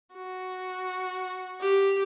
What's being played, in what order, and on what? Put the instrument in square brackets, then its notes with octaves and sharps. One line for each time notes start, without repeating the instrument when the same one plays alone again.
[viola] F#4
G4